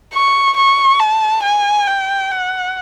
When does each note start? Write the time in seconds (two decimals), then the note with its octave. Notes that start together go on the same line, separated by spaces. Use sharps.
0.13 C#6
0.57 C#6
1.00 A5
1.43 G#5
1.87 G5
2.31 F#5